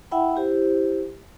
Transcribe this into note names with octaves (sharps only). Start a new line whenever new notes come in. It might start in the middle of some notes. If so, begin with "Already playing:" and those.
E4 E5 F#5 G5 B5
E4 G4 C5